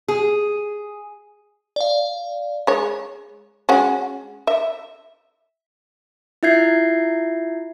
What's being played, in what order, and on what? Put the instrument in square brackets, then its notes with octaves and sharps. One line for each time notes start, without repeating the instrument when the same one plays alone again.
[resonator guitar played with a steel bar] G#4
[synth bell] D5 F5
[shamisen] G#3 C#5
G#3 C#4 F#4
E5
[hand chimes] E4 F4 E5 G6 G#6 C7